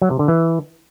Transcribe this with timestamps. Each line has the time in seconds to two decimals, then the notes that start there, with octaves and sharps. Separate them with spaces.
0.02 F#3
0.10 C3
0.19 D3
0.28 E3